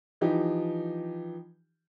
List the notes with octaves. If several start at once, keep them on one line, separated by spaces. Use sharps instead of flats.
E3 F3 D#4 G4